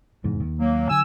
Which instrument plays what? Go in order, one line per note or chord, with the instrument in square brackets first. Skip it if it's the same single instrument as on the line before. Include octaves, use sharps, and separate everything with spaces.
[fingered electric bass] F1 E2 G#2
D#2
[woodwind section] F#3 A#3
[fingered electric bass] D3 F#3 [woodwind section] G#5 E6